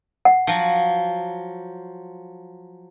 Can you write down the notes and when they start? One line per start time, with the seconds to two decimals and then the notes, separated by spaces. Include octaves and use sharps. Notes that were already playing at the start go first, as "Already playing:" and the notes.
0.25 F#5
0.47 F3 F#3